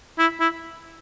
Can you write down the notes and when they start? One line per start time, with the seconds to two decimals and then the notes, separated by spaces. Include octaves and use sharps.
0.19 E4
0.40 E4